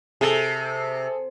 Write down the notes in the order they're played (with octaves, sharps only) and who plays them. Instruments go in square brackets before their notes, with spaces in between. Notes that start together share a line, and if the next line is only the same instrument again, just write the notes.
[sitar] C3 [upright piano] G#4 A4